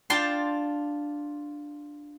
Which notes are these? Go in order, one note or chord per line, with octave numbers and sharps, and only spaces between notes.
D4 F4 G5 A5 C6